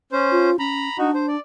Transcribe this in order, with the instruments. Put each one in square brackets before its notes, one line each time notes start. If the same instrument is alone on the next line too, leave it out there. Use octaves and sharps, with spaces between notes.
[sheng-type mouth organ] C#4 C5
[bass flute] F4
[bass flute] C#4 [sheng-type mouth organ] A#5 B5
[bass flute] D4 [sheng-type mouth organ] D#4 F#4
[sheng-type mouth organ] C5
D5